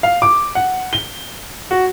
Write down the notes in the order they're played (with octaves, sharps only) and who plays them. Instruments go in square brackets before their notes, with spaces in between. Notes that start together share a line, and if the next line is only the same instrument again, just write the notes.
[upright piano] F5
D6
F#5
G7
F#4